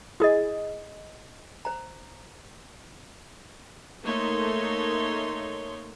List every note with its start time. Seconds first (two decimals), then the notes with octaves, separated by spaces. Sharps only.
0.20 E4 G#4 D#5 D#6
1.65 C5 A#5
4.04 A3 A#3 D#4 C#5 C6